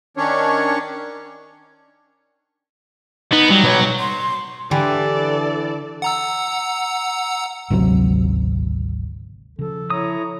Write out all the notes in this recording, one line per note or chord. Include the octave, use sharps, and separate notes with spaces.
D#3 C#4 D4 C#5
B3 D#4
F#3 G3
B2 B4 C#5
C6
D3 E3 G4 A4 D5
F#5 A#5 E6
G#1 D2 C3 F#3
C#3 F3 A4
E4 C#5 A#5 D#6